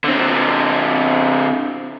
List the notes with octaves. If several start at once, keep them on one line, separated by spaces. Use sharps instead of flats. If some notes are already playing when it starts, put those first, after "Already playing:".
D3 C4